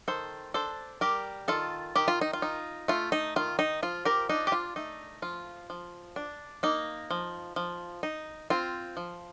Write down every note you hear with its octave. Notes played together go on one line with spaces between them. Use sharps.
D#3 A4 C5
D4 A4 C5
G3 G4 A#4
D#3 F4 A4
D#3 G4
F4
D#4
F4
D#4
A3 F4
D#4
D#3 F4
D#4
F3 F4
G4 A#4
D4 D#4
G4
F4
A3 D#4
F3 F4
F3
D4
A#3 D#4
F3
F3
D#4
C4 F4
F3